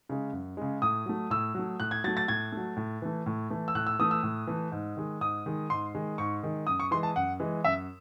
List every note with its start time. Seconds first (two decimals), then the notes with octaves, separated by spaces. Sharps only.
0.09 C#3 G#3
0.33 F#2
0.57 C#3 G#3
0.82 A2 D#6
1.06 F#3 A3
1.30 A2 E6
1.55 F#3 A3
1.80 A2 F#6
1.91 G#6
2.04 F#3 A6
2.08 A3
2.17 A6
2.28 A2 G#6
2.52 F#3 A3
2.77 A2
3.02 E3 A3
3.26 A2
3.50 E3 A3
3.68 E6
3.75 A2 F#6
3.87 E6
3.99 E3 A3 D#6
4.11 E6
4.23 A2
4.47 E3 A3
4.72 G#2
4.97 D#3 G#3
5.21 G#2 D#6
5.46 D#3 G#3
5.70 G#2 C6
5.95 D#3 G#3
6.18 G#2 C#6
6.43 D#3 G#3
6.67 F#2 D#6
6.80 C#6
6.91 E3 G#3 C6
7.03 A5
7.16 F#2 F#5
7.40 E3 G#3
7.64 F#2 E5